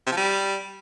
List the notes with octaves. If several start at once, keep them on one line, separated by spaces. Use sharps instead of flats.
C3
F3
G3